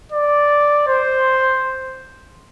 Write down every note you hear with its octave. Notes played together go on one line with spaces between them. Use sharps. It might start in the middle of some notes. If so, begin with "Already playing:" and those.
D5
C5